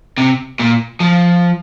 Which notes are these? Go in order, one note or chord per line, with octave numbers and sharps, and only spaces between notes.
C3
A#2
F3